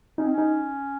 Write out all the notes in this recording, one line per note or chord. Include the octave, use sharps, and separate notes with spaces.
C#4 D#4
C4
C#4
D#4